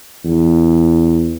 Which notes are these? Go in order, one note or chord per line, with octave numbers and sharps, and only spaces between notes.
E2